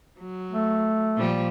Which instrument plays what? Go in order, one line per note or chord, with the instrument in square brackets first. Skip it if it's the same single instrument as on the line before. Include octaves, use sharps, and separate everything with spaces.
[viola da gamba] F#3
[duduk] A3
[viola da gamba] A#2 F3 G3